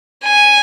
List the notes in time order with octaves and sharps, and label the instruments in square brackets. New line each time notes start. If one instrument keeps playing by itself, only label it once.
[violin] G#5